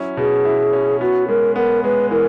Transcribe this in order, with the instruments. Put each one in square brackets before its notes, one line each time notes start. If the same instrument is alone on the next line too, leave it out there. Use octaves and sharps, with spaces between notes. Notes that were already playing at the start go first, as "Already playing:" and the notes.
Already playing: [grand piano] F#3 C#4 E4
[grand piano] B2 [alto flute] G#4
[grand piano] E4
C#4
[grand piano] B3 [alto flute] F#4
[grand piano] G#3 [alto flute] A#4
[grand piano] B3 [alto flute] A#4
[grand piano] G#3 [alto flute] B4
[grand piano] E3 [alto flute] A#4